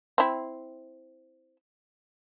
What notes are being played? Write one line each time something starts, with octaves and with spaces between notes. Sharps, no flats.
C4 E4